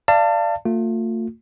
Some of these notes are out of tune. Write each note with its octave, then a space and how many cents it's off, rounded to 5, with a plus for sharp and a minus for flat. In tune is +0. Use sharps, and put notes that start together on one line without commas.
D5 +5 F5 -30 A5 +25
A3 +40 F4 +35